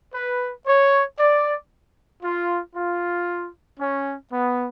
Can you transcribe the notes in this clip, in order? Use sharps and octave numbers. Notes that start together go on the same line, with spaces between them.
B4
C#5
D5
F4
F4
C#4
B3